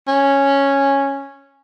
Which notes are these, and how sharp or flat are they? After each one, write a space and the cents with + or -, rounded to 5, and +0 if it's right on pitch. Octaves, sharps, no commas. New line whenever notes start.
C#4 -5